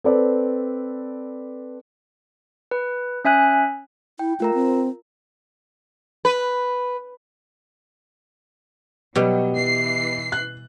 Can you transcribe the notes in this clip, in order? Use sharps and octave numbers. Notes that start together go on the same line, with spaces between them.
C4 A4 B4 D5
B4
C#4 E5 G#5 F#6
E4 G5
A3 F4 A#4 A#5
C4
B4
B2 F#3 G3 B3 G4 D#5
E3 C7
F#6